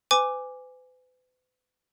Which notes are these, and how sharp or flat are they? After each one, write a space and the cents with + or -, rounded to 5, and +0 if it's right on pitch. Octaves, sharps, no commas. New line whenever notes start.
B4 +45 G#5 -10 D6 +0